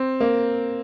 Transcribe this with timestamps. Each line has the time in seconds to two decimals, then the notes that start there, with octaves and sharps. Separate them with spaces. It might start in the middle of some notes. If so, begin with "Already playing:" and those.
Already playing: C4
0.20 A#3